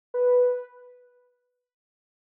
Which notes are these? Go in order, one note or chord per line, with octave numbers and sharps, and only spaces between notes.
B4